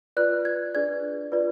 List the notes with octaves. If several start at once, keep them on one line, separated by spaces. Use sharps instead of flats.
F4 B4 D5 F#6
G#6
D4 G#4 B4 D5 G#6
F4 B4 D5